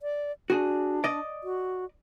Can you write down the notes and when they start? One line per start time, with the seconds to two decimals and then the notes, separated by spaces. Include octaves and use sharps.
0.02 D5
0.50 D4 F#4 G#4
1.04 D5 D#5
1.44 F#4